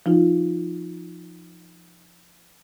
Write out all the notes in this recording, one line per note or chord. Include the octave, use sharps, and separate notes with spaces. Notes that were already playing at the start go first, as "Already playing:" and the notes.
F3 D#4 F4